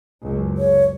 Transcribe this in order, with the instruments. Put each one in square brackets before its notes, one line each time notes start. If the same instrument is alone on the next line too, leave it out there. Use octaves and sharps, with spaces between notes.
[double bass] F#1 C#2
[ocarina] C#5